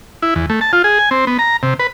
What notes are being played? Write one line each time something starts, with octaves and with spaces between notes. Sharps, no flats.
E4
E2
A3
A5
F4
G#4
G#5
C4
B3
A#5
C3
B4